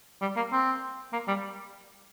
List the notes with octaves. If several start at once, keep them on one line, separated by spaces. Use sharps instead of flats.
G3
A#3
C4
A#3
G3